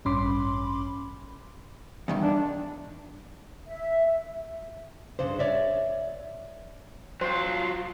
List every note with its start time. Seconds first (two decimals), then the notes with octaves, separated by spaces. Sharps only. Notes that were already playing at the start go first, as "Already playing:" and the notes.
0.05 A1 G2 C#4 B5 C6 D6
2.08 E2 G2 D#3
2.23 D4
3.68 E5
5.19 G2 C#3 D4 C5
5.39 C#5 D5 E5
7.21 F#3 F4 C5